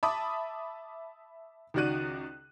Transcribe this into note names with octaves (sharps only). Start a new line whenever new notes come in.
E5 A5 B5 D6 D#6
C#2 D#3 F#4 D5 F#6 D#7